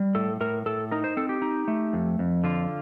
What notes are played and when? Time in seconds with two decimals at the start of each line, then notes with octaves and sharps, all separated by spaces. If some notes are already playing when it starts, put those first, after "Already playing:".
Already playing: G3
0.15 A2 A4
0.41 A2 A#4
0.66 A2 A4
0.91 D#4 A#4
1.04 C5
1.17 C4 A4
1.29 G4
1.42 D#4
1.68 A3
1.93 F2
2.19 F2
2.44 D3 F4